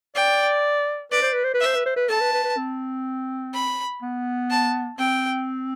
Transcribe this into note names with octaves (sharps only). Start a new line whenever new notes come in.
D5 G5
B4 D5
C5
B4
C5
B4
C5 E5
B4
C5
B4
A4 A5
B4
B4
B4
C4
B5
B3
A5
C4 G5